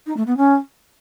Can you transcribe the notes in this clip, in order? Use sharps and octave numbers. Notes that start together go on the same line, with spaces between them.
D#4
A3
B3
C#4